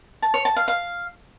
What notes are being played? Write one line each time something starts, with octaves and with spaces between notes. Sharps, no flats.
A5
C#5
A5
F5
F5